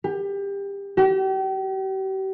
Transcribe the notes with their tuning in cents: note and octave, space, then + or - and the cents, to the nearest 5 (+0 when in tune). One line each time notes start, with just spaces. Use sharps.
G4 +25
G4 -40